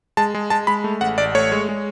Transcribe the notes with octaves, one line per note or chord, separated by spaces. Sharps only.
G#3 A5
G#3
G#3 A5
G#3 B5
A3
A1 F#5
A1 D5
A3 C#5
G#3
G#3